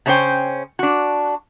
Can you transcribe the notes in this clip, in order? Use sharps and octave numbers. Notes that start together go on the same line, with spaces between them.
C#3 A3 C#4 D#4 C5 G5
D4 F#4